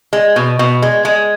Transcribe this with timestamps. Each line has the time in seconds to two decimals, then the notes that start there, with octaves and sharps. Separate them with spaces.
0.13 G#3
0.36 B2
0.59 B2
0.82 G#3
1.05 G#3